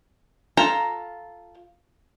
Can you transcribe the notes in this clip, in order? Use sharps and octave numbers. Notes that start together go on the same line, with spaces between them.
F4 A4 A#5